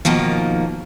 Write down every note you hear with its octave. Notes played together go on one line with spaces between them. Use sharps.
B2 D#3 F3 A#3